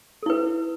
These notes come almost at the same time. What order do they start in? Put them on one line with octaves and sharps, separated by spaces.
A4 E4 B4